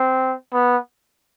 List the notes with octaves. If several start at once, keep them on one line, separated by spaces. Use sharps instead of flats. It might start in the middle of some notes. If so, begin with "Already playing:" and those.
Already playing: C4
B3